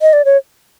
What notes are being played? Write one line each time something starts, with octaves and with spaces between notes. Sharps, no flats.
D#5
D5
C#5